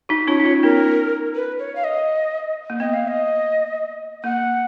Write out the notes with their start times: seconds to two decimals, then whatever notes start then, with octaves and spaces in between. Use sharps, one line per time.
0.09 D#4 F#4
0.27 C#4 F4 C#5
0.40 D#4
0.45 C#4 F4
0.63 B3 D#4 A#4
1.36 B4
1.59 C#5
1.76 F5
1.84 D#5
2.70 A#3
2.80 B3 D#5
2.94 F5
3.08 D#5
4.24 A#3 F#5